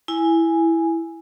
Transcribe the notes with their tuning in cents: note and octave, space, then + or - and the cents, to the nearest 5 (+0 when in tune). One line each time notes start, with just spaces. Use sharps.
E4 +0 G#5 +0